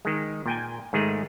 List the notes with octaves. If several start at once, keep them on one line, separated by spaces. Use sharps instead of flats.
D#3 G#3
A#2 G5 G#5
G#2 D#3 G#3 A3 G#4